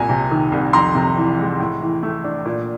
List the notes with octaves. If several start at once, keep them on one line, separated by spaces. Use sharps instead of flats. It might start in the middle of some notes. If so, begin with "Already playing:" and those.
Already playing: C2 A#2 G#5 A#5
C3
D#3
C2
F2 A#5 C6
C3
E3
G#3
A2
E3
A3
D4
A#2